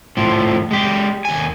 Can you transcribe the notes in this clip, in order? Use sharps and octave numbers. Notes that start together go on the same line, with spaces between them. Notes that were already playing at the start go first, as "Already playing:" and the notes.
A2 F3
G#3 G4
D#2 G#5